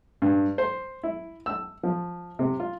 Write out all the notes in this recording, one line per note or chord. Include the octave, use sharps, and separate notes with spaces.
G2
C5
E4
E6
F3
C3
F4